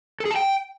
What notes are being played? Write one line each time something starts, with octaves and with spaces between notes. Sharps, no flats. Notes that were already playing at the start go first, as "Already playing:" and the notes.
A4
G#4
A5
G5